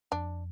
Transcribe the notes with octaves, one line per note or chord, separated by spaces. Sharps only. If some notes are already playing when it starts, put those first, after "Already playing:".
F2 D4